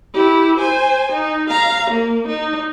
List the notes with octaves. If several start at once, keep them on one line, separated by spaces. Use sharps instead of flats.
E4 G4
C5 G#5
D#4
F5 A#5
A#3
D#4